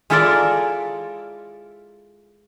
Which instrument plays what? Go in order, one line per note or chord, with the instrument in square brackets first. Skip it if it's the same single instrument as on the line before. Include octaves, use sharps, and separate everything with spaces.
[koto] G#3 E4 F4 A4 A#4 D5